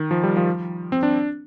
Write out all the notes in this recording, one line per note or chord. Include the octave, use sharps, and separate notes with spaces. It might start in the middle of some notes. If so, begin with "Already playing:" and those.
Already playing: D#3
F3
G3
F3
C4
D4